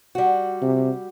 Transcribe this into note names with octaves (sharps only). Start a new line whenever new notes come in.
G3 F#4
C3